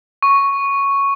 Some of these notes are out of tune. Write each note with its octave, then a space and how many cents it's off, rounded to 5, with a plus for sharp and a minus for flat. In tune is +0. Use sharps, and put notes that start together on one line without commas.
C#6 +0